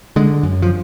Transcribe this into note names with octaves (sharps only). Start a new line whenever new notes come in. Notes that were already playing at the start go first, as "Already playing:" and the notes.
D3 G#3
F#2
F3